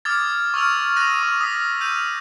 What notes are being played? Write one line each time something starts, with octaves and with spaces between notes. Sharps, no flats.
D6 D#6 F6 G#6 A6
C#6 E6 F6 F7
D#6 F#6 A#6 D#7
C#6
D#6 B6
E6 G6 D#7 F7